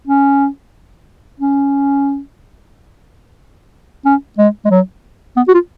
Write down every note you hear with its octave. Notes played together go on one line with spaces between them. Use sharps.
C#4
C#4
C#4
G#3
G#3
F#3
B3
F#4
F4